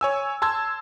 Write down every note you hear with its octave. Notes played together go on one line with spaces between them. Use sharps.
C#5 G#5 E6
A5 C6 E6 G#6